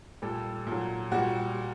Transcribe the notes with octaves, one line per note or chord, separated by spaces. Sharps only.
A#2 G3 A4
A#2 F#3
A#2 G3 F#4